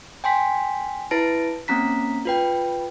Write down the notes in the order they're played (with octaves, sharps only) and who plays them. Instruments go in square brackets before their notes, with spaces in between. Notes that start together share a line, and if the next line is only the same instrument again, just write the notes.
[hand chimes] G5 G#5 C6 B6
E4 B4 A5 A#6 D7
A#3 C4 C#4 A#5 B6
F4 B4 G5